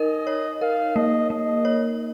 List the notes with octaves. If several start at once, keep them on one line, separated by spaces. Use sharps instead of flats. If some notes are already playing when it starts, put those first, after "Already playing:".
Already playing: D#4 A#4 D#5
C#5
A#4 F5
A#3 D#5
A#3 D#5
C#5